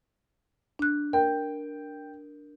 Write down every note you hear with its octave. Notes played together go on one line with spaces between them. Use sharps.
D4 F#6
A#4 G5